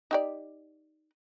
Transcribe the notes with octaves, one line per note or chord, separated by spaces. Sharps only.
D#4 G4 D5